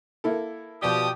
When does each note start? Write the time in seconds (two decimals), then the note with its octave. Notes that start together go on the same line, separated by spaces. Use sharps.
0.24 A#3 E4 A4
0.82 B2 F3 G4 D5 D#6